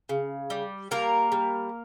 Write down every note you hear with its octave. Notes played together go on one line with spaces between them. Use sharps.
C#3
G3
G3 A#3 A#4
G3